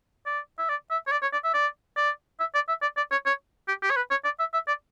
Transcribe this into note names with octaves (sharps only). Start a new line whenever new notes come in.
D5
E5
D5
E5
C#5
D5
C#5
D5
E5
D5
D5
E5
D5
E5
D5
D5
C#5
C#5
G4
G4
C#5
B4
C#5
D5
E5
E5
D5